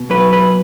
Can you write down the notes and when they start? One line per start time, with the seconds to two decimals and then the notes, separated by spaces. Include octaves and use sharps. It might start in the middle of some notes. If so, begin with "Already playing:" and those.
Already playing: B2
0.10 F#3 B4
0.33 B4